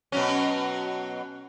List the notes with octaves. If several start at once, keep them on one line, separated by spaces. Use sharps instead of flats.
B2 F#3 C#4